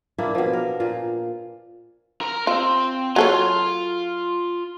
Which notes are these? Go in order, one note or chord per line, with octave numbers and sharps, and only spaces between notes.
A#2 A#3 D4 E4
B2 F3
A#4
A#2 F4
A#4 A#5
C4 F4
F#3 F4 A4 C#5